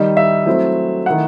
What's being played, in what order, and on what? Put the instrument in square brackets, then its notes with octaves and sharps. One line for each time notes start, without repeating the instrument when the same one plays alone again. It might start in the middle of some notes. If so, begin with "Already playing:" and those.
Already playing: [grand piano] D#3 G3 D#4 D#5
E5
F#3 A3 C4 E4
D#3 A3 E4 F#5